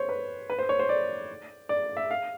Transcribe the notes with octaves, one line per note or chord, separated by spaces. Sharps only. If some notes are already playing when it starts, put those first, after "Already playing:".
Already playing: C5 C#5
B4
B4
C5
C#5
C5
D5
D5
E5
F5